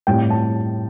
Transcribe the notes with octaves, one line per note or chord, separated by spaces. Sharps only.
A2 G3 C4 G5
A5